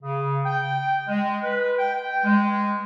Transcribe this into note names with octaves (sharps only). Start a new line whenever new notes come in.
C#3
G5
G#3
B4
G5
G5
G#3